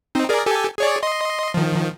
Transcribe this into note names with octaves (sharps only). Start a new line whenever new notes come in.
C4 D#4
G#4 A#4 D5
G4 A4 G#5
G#4 C#5 D5
D#5 C6
D#3 F3